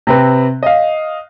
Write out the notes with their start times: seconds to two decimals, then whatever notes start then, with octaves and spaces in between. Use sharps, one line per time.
0.07 C3 C4 B4
0.63 D#5 F5